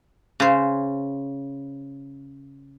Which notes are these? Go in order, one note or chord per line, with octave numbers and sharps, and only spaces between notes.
C#3 C5